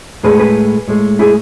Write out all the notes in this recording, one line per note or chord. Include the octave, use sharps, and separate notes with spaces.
A2 G#3 G#4 B4
G#4 B4
A2 G#3
E4 G#4